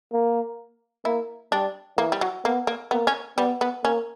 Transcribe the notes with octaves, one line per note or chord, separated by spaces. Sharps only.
A#3
A#3 E4
G3 D4
E3 A#3
G3
F#3
A#3 B3
A#3
A#3 B3
C#4
G3 B3
B3
A#3 C#4